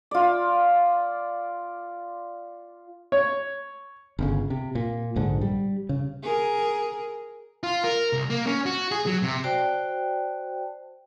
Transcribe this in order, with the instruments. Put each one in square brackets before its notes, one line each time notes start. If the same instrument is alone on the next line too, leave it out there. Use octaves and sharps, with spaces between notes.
[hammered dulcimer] F4 D5
[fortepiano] C#5
[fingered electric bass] G1 C#3
C3
A#2
A#1 G#2 D3
G3
C#3
[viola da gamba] G#4 A#4
[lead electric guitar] F4
A#4
C2
A#3
C#4
F#4
G#4
F#3
C3
[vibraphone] F#4 C5 D5 G5 A5